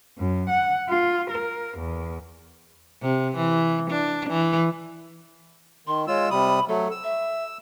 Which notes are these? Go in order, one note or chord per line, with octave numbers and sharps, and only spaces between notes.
F#2
F#5
F4
A#4
E2
C3
E3
D4
E3
D#3 C6
G#3 F4 C#5 E6
C3 G3 B5 D#6
F#3 A3 A4
E6
E5